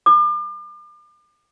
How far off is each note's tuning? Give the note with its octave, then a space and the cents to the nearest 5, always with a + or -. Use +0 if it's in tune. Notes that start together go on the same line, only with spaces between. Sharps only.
D6 +40